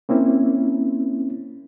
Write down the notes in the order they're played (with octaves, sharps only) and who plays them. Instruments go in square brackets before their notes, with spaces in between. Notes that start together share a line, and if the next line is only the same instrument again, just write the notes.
[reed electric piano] A#3 C4 C#4 E4